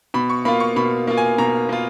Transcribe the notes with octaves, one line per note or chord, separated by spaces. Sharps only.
B2 B5
C#6
A#3 F4 B5
C#6
B2 B5
A#3 F4
G#5
B2 A#5
A#3 F4